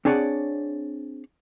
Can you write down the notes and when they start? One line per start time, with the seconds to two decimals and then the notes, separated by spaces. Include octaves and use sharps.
0.05 C4 D4 G#4 C#5 D5 F#5